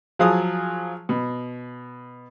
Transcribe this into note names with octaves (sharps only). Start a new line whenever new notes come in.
F3 F#3 F4 G#4 A5 D#6
B2